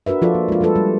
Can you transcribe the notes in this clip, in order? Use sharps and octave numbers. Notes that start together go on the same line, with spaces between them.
D4 F#4 A#4 B4 E5
F3 F4 A4 D5
A#3
G#3 F4
F3 G3 G#3 F4 A4 B4
G3